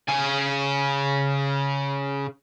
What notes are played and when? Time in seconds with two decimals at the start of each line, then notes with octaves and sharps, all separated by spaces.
0.09 C#3 G#5